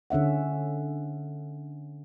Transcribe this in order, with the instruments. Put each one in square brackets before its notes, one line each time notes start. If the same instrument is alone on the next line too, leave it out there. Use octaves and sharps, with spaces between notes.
[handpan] D3 C#4 E5 F#5